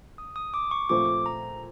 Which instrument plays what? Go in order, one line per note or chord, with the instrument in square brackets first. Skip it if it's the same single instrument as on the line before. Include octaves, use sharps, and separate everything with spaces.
[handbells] D#6
D#6
D6
C#6
[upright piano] A#2 F3 A3 C4 [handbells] D6
[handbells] A#5